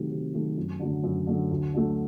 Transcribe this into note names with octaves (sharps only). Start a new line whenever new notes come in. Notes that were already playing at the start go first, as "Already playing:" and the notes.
Already playing: C3 D#3 F#3 A3
C3
D#3 F#3 A3
F#2
D3 F#3 A3
F#2
D3 F#3 A3
D2
D3 F#3 A3